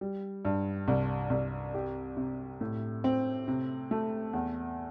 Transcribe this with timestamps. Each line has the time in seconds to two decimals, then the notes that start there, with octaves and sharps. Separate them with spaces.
0.01 G3
0.45 G2
0.88 C2
1.30 C2
1.74 G4
2.17 C3
2.61 A2
3.04 C4
3.48 C3
3.91 A3
4.33 E2